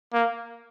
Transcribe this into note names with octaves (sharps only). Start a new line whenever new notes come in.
A#3